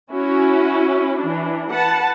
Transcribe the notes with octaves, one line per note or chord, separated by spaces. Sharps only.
C#4 E4 F#4
E3 D4
B4 F#5 A5